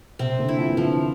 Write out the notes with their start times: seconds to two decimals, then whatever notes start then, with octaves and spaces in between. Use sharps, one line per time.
0.19 C3 C4
0.39 D3
0.49 E4
0.58 F3
0.69 E3
0.77 D3 F3